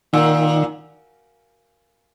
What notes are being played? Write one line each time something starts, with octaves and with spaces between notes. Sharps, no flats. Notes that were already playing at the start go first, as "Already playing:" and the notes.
A#2 D#3